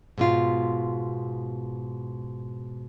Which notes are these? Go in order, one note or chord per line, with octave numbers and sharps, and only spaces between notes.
G#2 B2 F4